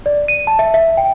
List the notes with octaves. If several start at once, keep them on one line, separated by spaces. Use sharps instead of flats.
D5
D#7
A5
E5
E5
G5